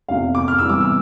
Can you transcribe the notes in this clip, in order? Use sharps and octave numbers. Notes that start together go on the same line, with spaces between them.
F1 E2 C3 F5
D6
F6
E2 C3 E3 G3 E6
D6
E6